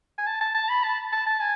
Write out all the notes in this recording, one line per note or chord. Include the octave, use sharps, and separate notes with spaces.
G#5
A5
A5
A5
B5
A5
A5
A5
G#5